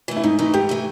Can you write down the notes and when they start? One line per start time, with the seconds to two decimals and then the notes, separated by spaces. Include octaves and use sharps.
0.08 E3 A3
0.16 E4
0.23 G#2 D#4
0.39 E3 A3 D#4
0.54 G#2 G4
0.69 E3 A3